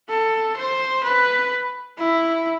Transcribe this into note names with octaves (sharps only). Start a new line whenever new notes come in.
A4
C5
B4
E4